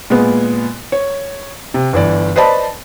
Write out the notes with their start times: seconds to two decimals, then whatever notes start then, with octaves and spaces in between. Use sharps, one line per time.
0.10 A#2 G#3 B3
0.92 C#5
1.74 C3
1.93 G1 E3 D5
2.36 B4 C5 D5 D#5 A5 B5